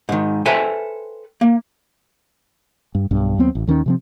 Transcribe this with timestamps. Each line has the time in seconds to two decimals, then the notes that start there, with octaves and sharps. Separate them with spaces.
0.09 G#2 D#3
0.46 A4 B4 C5 E5 G5 G#5
1.41 A#3
2.95 G2
3.11 B1 G2
3.38 D#2 F#3 B3 C4
3.55 A1
3.67 D#2 D#3 C#4
3.86 C3 F3 C4